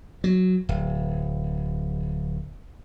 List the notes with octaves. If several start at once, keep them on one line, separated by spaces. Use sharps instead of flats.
F#3
D1